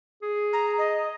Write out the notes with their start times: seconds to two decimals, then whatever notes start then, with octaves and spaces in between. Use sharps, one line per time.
0.22 G#4
0.53 A#5
0.78 D#5